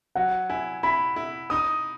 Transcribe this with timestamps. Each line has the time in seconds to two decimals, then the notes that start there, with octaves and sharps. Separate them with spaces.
0.15 F#3 F#5
0.49 E4 G#5
0.83 E4 B5
1.16 E4
1.50 D#4 D#6